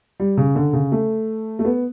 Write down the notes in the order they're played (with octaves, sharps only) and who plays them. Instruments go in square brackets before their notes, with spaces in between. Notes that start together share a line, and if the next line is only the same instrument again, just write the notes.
[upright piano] G3
C#3
D3
C#3
A3
A3
B3